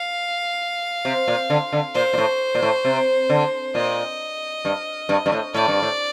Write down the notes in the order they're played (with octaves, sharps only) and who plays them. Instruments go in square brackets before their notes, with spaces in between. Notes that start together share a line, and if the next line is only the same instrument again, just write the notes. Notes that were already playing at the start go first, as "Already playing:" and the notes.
Already playing: [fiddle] F5
[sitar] C3
A#2
D3
D3
[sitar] A#2 [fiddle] C5
[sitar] A#2
A2
A#2
A2
C3
D3
[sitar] A#2 [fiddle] D#5
[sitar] G2
G2
G2
A2
[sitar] A2 [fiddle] D5
[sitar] G2
A2